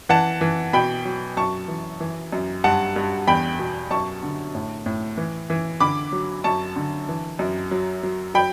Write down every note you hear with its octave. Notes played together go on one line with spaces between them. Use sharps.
E3 F#5 A5
E3
B2 G5 B5
F#3
F#2 A5 C#6
E3
E3
F#2
G2 F#5 A5
G2
E2 G5 B5
B2
F#2 A5 C#6
D3
A2
A2
E3
E3
D3 B5 D6
F#3
F#2 A5 C#6
D3
E3
F#2
F#3
F#3
F#3 G5 B5